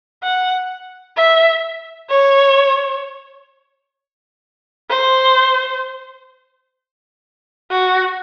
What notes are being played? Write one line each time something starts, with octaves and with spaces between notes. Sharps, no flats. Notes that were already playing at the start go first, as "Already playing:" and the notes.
F#5
E5
C#5
C5
F#4